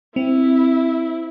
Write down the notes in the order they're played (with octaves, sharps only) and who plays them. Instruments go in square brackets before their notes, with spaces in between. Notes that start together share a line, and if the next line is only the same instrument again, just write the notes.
[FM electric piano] C4 [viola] E4